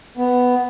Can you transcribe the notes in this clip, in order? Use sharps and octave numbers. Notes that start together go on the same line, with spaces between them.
B3